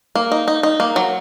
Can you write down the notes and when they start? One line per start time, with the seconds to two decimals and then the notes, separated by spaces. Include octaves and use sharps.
0.15 A#3
0.32 D#4
0.48 D#4
0.63 D#4
0.80 A#3
0.96 F#3